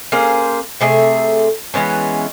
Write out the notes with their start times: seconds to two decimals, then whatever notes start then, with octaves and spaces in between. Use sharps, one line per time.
0.12 A#3 C#4 G#4 C5
0.81 C3 A3 G#4 E5
1.74 E3 G#3 B3 C#4